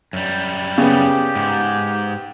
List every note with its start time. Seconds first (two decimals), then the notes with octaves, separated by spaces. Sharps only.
0.13 F#2 G3
0.78 C#3 B3 G4
1.36 G#2